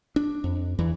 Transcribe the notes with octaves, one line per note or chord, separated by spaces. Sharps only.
D4
F2
E2 E3